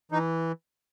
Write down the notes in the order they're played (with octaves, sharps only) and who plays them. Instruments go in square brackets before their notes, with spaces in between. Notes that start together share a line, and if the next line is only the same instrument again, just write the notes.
[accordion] E3 D#4